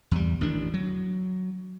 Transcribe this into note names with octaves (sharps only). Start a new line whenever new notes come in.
E2 G3
A1 D#3 D4
F#3